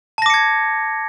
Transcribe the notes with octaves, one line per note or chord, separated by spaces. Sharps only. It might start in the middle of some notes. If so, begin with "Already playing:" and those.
A5 D6 G#6 A#6 C#7